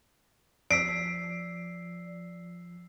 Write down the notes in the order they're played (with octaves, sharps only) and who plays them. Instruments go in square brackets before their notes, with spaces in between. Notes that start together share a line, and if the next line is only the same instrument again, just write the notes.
[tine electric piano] F3 [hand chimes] D5 [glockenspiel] E6 B6 C7 [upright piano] D7